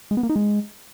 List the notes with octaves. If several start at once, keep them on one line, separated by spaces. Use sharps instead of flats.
G#3
B3
A#3
D#4
G#3